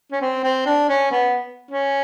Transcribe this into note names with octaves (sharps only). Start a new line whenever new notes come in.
C#4
C4
C4
D4
C#4
B3
C#4